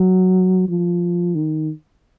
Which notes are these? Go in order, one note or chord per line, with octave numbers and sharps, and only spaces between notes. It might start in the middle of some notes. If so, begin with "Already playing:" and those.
Already playing: F#3
F3
D#3